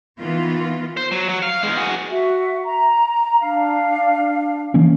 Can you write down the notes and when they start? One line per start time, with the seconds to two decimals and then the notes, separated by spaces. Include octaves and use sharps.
0.19 D#3 E3 B3 F4
0.97 C5
1.12 F#3
1.29 F#3
1.43 F5
1.63 E2 G#3
1.77 F#4 G#4
2.10 F#4 E5
2.65 A#5
3.41 D4 F5
4.74 E3 A#3 C#4